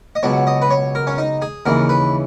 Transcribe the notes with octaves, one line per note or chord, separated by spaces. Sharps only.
D#5
C#2 B2 F#3 C#5
D#5
B4
C#5
A#4
C#4
D#4
G#4
D#2 C#3 E3 A#4
B4